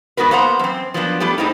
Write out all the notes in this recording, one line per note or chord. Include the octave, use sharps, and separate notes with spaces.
G#2 B3 F#4 A#4 B4
A#3 B3 C5 F#5 A#5
F#2 C4
F3 F#3 A#3 B3 D4
G3 A3 B3 D4 G4
A2 G#3 C4 D#4